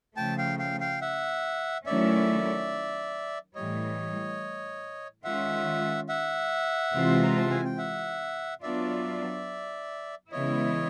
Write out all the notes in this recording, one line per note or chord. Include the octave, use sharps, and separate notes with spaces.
C#3 F3 A3 G5 A5
F5 G5
F5 G5
F5 G5
E5 F#5
D#3 F#3 A3 C#4 E4 D5 E5
A2 E3 G3 C#5 D#5
D#3 G#3 C#4 F4 E5 F#5
E5 F#5
C3 E3 G#3 C4 F4
A#5
A5
G#5
G5
E5 F#5
F#3 B3 D4 F4 D5 E5
C#3 E3 G#3 B3 E4 C#5 D#5